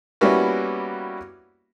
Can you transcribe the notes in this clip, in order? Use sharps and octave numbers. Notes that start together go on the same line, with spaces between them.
G3 A#3 B3 C#4 E4 F#4